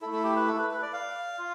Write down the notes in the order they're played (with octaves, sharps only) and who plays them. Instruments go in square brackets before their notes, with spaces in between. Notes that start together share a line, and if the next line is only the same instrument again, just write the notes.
[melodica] E4 A4
A3
A4
G4
B4
A4
B4
B4
D5
F5
F4